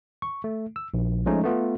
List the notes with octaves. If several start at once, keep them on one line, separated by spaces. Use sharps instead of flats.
C#6
A3
E6
A#1
F3 G#3 A3 C#4 D#4
A3 B3 F4